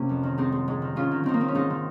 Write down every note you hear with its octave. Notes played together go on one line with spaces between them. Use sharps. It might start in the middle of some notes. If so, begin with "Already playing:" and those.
Already playing: C3 A#3 C#4
F2
D#3
G#2 C4 D#4
G#2
G#2
D#3
G#2 C#4 F4
D#3
D#3 C4 D#4
A#3
D#3 C4
C#4
G#2 C4 D#4
D#3